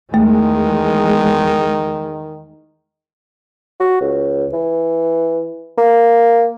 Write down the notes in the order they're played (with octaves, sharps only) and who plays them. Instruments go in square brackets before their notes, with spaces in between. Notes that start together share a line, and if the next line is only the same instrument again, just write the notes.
[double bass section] E2 G#3 [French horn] D#3 [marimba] A3
[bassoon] F#4
C#2
E3
A#3